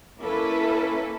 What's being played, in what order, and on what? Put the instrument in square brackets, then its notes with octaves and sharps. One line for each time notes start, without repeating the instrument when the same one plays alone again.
[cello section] A#3 C#4 E4 A4 B4